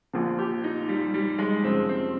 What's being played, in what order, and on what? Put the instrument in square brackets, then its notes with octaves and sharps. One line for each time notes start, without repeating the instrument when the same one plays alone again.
[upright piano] A#1 A#2 F3
[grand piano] G4
D#4
G3
G3
G#3
[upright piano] F2 C3 F3 G#3 C#4 [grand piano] C4
[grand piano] C4